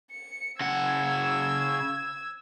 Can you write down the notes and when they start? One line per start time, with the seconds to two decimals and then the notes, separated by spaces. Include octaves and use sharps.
0.11 C#7
0.61 C#3 F#5 E6 G#6